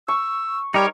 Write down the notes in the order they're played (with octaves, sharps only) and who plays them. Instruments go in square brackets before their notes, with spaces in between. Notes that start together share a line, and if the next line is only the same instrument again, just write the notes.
[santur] C#6 [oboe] E6
[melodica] G3 G4 [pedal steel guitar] D#4 A#4 C#5